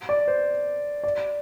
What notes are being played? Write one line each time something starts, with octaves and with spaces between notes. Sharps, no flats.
D5
C5
D5